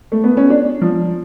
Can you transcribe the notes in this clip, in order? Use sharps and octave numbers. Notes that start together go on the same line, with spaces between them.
A3
B3
C#4
D4
F3